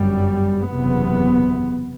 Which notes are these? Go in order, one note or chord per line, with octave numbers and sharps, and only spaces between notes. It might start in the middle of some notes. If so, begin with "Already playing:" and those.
Already playing: G1 F#2 G3
F#1 E2 C3 B3